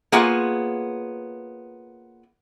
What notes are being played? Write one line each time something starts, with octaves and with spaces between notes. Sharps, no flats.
A#3 B3 F4 G#4 C#5 F#5